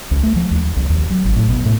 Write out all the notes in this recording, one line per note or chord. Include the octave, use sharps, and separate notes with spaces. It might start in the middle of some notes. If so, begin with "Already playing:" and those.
C#2
A3
F3
D#2
C2
D#2
F#3
G#1
A2
B2
A2